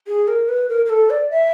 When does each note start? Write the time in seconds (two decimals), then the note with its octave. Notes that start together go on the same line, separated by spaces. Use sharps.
0.08 G#4
0.28 A#4
0.49 B4
0.69 A#4
0.85 A#4
0.90 A4
1.10 D5
1.30 E5